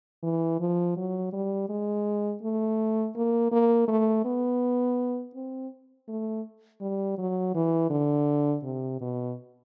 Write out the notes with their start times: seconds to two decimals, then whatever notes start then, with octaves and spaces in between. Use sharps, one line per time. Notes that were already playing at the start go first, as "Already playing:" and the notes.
0.23 E3
0.60 F3
0.97 F#3
1.33 G3
1.69 G#3
2.42 A3
3.16 A#3
3.52 A#3
3.88 A3
4.25 B3
5.35 C4
6.08 A3
6.81 G3
7.18 F#3
7.54 E3
7.90 D3
8.63 C3
9.01 B2